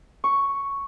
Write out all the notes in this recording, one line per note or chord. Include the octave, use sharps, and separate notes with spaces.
C#6